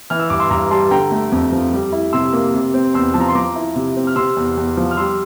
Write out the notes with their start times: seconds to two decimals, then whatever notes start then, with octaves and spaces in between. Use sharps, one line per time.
0.10 E3 F6
0.20 E6
0.30 G2 D6
0.40 C6 E6
0.50 G2 A#5 D6
0.71 G3 A5 C6
0.91 D3 G5 A#5
1.11 A3
1.32 F2
1.52 F3
1.73 G3
1.92 E4
2.13 C3 C6 E6
2.33 A#3
2.55 C3
2.74 C4
2.94 E2 C6 E6
3.14 F3 A5
3.20 A#5
3.28 C6
3.35 F3 A#5 D6
3.55 E4
3.76 C3
3.96 C4
4.07 F6
4.16 C3 C6 E6
4.37 E2
4.57 E2
4.77 F3
4.91 F6
4.97 G3 C6 E6